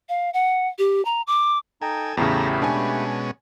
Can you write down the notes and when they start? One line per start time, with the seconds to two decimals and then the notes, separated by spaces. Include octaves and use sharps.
0.09 F5
0.34 F#5
0.79 G4
1.05 A#5
1.27 D6
1.82 D#4 A4 G5 G#5 A#5
2.17 E2 A2 C#3 A3 G4 A4 A#5 B5
2.62 B2 G#3 C#4 D4 G#5